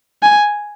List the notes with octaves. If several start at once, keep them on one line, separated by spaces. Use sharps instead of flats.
G#5